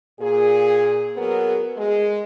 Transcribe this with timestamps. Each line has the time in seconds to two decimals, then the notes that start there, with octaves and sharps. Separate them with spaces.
0.19 A#2 G#4
1.16 F#3 B3 G#4 A#4
1.76 G#3